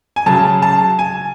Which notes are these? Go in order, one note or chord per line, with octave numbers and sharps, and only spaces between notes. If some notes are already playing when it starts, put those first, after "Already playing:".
G#5
C#3 F#3 A5
A5
G#5